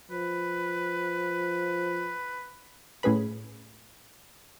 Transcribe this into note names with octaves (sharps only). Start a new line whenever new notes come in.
F3 B4
A2 C#4 G#4 B4 B5